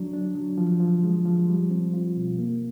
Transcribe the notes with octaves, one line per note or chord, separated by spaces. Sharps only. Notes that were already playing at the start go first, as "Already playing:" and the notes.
Already playing: F#3 D4
D4
F#3
F3
F3
G#3
F3
G3
C4
F4
B2
A#3